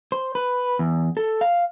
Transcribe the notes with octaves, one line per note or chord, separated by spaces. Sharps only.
C5
B4
E2
A4
F5